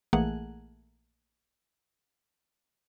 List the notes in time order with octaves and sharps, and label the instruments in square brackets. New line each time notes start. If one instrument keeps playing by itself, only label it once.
[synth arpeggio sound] A#1 E3 A3 A#3 G#4 F#5